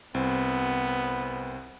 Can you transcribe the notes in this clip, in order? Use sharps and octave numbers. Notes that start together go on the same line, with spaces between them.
C2 B3 C4